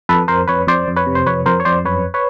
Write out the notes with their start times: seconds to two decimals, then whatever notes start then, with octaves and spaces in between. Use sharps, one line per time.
0.09 F2 A4 B4
0.28 F2 A#4 C5
0.48 F2 B4 C#5
0.67 F2 C5 D5
0.88 F2
0.96 B4 C#5
1.06 C3
1.15 C5
1.26 F2 B4 C#5
1.46 F2 A#4 C5
1.60 C#5
1.65 F2 C5 D5
1.85 F#2 B4 C#5
2.14 B4 C#5